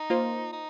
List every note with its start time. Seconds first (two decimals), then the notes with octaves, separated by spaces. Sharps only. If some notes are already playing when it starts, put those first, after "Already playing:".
Already playing: D#4
0.10 A#3 F4 C5
0.52 D#4